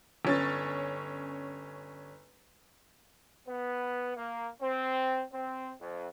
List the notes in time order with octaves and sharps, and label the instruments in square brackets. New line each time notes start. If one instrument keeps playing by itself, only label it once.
[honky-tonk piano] G1 C#4 A6
[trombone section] B3
A#3
C4
C4
F2